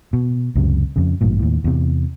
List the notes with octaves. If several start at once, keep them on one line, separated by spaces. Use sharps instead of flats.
B2
C#2 F#2 C3
F2 C#3
A1 G2 A#2
D#2 A2
E2 C3